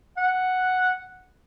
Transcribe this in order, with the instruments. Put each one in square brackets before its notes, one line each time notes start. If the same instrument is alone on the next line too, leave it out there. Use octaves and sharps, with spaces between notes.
[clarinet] F#5